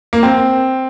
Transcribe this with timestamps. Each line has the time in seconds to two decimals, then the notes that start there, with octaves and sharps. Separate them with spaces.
0.13 A#3
0.23 C4